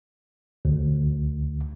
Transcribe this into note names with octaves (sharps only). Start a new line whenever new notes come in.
D2